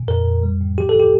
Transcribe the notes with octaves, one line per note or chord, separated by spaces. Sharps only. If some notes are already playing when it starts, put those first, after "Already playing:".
Already playing: A#2
F2 A#4
F2
G3
A2
F3 G4
A4
F3 G4